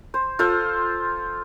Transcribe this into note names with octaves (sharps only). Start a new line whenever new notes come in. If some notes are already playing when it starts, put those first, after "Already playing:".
C5
F4 A4 C5